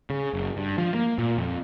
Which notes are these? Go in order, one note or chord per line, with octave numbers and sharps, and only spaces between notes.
C#3
F#1
G2
F3
A#3
A#2
F2